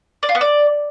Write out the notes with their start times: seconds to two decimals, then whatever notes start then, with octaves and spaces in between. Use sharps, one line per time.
0.23 D5
0.29 F4
0.35 B3
0.41 D5